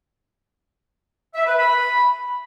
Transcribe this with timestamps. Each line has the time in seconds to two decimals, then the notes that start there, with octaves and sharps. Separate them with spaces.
1.35 E5
1.46 B4
1.58 B5